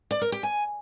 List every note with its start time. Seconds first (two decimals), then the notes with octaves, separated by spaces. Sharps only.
0.11 D5
0.21 A#4
0.32 G4
0.43 G#5